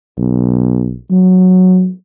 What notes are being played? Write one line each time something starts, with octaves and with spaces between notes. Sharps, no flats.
B1
F#3